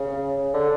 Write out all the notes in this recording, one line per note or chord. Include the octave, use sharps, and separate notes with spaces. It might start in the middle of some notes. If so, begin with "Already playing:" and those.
Already playing: C#3
D3